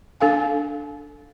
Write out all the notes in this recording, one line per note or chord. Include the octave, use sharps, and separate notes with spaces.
D4 A4 F5 G#5